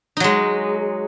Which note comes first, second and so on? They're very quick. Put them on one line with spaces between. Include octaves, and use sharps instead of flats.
D#4 F#3 G#3